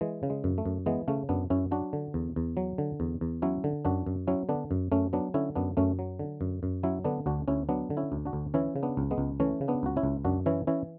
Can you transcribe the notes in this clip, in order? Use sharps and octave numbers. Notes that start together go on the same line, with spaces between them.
E3 G#3
C#3
G#3
F#2
A3
F#2
E3 G#3 B3
C#3 A3 C#4
F#2 B3 D4
F#2 C#4 E4
F#3 D4 F#4
D3
E2
E2
F#3
D3
E2
E2
F#3 C#4 E4
D3
F#2 D4 F#4
F#2
F#3 C#4 E4
D3 B3 D4
F#2
F#2 A3 C#4
F#3 B3 D4
D3 C#4 E4
F#2 B3 D4
F#2 A3 C#4
F#3
D3
F#2
F#2
F#3 C#4 E4
D3 B3 D4
D2 D4 F#4
D2 C#4 E4
F#3 B3 D4
D3
C#4 E4
D2
D4 F#4
D2
E3 C#4 E4
C#3
B3 D4
C#2
G#3 B3
C#2
E3 A3 C#4
C#3
B3 D4
C#2 F#4
C#4 E4
C#2
F#2 D4 F#4
E3 C#4 E4
E3 C#4 E4